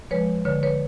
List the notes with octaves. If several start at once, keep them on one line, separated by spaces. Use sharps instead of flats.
F3 G#3 B4 C#5
D3 B4 C#5
B4 C#5